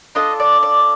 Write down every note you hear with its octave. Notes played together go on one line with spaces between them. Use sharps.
D4 F4 A4 D#5
D5
D5